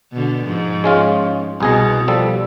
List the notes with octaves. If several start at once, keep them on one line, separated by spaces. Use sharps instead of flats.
B2 D3
G#2 F3
G#3 C#4 F4
C2 B2 G#4 D#5
F3 G3 A4